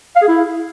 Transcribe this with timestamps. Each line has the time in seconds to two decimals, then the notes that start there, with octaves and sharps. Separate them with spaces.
0.16 F5
0.22 G#4
0.28 E4